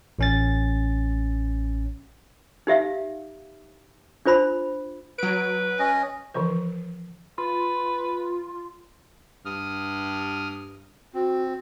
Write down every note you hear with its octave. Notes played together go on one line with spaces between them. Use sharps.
A1 C#4 A6
D#4 G4 E5 F5
D4 F4 C5 B5 C6
F#3 B4 D7
C#4 D#5
D3 E3 F3 B4
F4 B4
G2 D#6 F6
C4 F#4